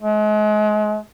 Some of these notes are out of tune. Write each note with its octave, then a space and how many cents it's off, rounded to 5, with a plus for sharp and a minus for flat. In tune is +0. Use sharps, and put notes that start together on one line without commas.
G#3 +35